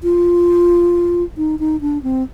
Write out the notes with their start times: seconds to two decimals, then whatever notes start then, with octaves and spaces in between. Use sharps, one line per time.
0.03 F4
1.37 D#4
1.59 D#4
1.81 D4
2.03 C4